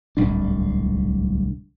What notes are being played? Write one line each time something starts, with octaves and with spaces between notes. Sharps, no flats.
D1 C2 G#2 D4